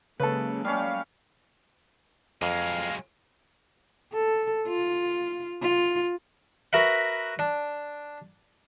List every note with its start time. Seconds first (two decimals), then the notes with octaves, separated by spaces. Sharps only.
0.20 C#3 F#3 G#3 A#3 A4 B4
0.65 G3 A3 C#4 F5
2.42 F2 F#3 G#3 F5
4.13 A4
4.67 F4
5.62 F4
6.73 F#4 A#4 B4 E5 F#5
7.39 D4